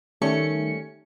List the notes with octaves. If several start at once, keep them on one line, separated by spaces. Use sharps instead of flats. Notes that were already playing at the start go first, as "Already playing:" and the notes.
D#3 G3 A3 C#4 C#7